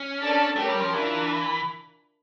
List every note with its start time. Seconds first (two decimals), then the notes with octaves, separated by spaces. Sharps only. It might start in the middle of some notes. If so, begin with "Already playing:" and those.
Already playing: C#4
0.19 D4 A4 D5 A5
0.56 A3 C#4 G4 A#4
0.69 G3
0.81 F3
0.93 E3 D4 F4 A#4 E5 A5